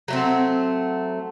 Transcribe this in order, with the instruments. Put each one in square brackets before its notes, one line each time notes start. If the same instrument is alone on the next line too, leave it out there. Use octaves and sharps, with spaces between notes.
[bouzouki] F#3 A3 C4